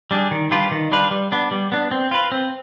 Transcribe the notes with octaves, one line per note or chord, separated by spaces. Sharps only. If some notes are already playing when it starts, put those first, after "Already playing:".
G3 D4 G#4
D#3
G3 D4 F4 B4
D#3
G3 D4 F4 B4
G3
B3 D4
G3
B3 D4
C4
F4 B4
C4